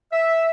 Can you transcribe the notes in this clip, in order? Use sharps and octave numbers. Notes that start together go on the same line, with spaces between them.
E5